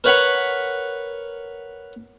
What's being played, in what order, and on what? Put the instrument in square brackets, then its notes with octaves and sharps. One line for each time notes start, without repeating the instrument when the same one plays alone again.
[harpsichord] A#4 B4 C#5 F#5 B5